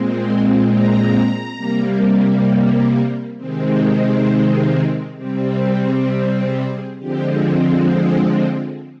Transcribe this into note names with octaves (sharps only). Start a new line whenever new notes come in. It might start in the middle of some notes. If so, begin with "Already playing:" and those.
Already playing: A#2 G#3 C4
C6
A#5
C3 G3 A#3
C3 D#3 G#3 C4
F5
C3 G3 C4
A#4
G#4
G4
G#4
G#4
D3 F3 G#3 C4 G4
G#4